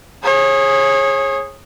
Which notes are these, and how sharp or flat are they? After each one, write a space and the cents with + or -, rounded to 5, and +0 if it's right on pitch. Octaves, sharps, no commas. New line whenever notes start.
G#4 -5 C#5 -30